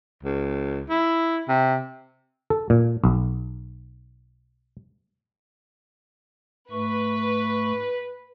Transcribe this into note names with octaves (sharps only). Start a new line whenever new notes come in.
C#2
E4
C3
A4
A#2
B1
G#2 A3 B4 C#6